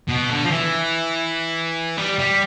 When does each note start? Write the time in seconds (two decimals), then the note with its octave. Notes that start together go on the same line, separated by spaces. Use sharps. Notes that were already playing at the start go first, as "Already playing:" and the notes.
0.09 B2
0.30 D3
0.45 F3
0.51 E3
1.98 G3
2.19 G3